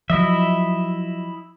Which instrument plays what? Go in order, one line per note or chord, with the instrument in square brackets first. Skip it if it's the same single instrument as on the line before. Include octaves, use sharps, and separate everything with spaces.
[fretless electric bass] F3 F#3 [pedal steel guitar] E4 D#5 E5